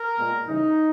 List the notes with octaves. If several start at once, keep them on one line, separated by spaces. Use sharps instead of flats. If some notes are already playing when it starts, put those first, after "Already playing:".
Already playing: A#4
A#2 G#3 B3
C#3 E3 G3 D#4